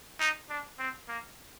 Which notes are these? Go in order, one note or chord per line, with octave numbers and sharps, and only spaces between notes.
D#4
D4
C4
A#3